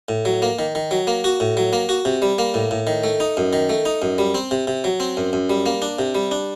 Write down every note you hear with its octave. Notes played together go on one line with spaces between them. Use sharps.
A2
F#3
A#3
D#3
D#3
F#3
A#3
F#4
A2
F#3
A#3
F#4
C3
G3
A#3
A2
A2
D#3
A3
D#4
F#2
D#3
A3
D#4
F#2
G3
C4
C3
C3
F#3
C4
F#2
F#2
G3
A#3
D4
C3
G3
D4